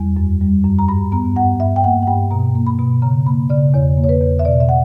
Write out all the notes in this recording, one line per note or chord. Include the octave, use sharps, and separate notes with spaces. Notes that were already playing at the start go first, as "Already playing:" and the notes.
Already playing: E2 G3
F#2
G3
F#2
A#5
G2 B5
B3 A#5
G2 F#5
G2 E5
G5
A#3 F#5
F#5
G2 G5
B2 A#5
A#3
B5
B2
C#3 A#5
A#3 B5
C#3 D5
E2 C#5
A#3
C#5
B4
E2
E5
B2 D5
E5
F#5